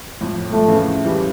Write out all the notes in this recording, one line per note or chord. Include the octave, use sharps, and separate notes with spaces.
F2 A2
F2 A2 A3
C#3 E3
E3 G3